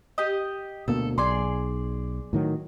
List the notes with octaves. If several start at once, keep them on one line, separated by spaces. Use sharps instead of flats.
G4 D#5
D2 B2 A#3 A4
B1 G#4 D5 C6
A2 D#3 F#3